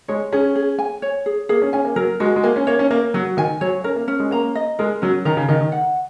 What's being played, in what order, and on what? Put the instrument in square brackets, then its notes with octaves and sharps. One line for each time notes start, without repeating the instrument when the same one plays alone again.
[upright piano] G#3 [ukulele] C#5
[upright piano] C#4 [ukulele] G#4
[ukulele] G#4
G#5
C#5
G#4
[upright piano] A#3 [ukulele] G#4
[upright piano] C#4
[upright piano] C#4 [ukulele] G#5
[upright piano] A#3
[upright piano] F#3 [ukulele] A#4
[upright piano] G#3 [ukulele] F#4
[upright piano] G#3
[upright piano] A#3 [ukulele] G#5
[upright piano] C#4
[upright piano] A#3 [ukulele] C#5
[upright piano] C#4
[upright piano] A#3 [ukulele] A#4
[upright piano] F#3 [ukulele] F#4
[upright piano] D#3 [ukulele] G#5
[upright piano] F#3 [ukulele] C#5
[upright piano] C#4 [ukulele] A#4
[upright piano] A#3
[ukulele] C#4
[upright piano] G#3
[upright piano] A#3 [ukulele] A#5
[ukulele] D#5
[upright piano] G#3 [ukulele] A#4
[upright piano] F#3 [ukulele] C#4
[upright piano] D#3 [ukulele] A#5
[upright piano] C#3
[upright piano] D#3 [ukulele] D#5
[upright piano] D#3
[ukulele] F#5